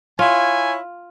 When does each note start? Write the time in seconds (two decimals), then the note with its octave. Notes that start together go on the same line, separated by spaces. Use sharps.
0.19 E4 F4 C#5 G#5